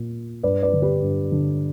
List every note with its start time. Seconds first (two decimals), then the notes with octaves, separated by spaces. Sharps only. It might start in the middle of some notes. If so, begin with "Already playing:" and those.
Already playing: A#2
0.43 G2 B4 D5
0.62 B4 D5
0.73 D3
0.82 G4 B4
1.02 G2
1.32 D3